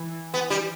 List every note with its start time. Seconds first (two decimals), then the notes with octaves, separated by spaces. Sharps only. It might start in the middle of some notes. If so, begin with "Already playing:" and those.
Already playing: E3
0.34 B3
0.50 G3